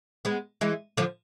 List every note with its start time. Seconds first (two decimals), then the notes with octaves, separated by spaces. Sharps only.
0.25 G#3 B3
0.61 E3 G#3
0.97 D3 F3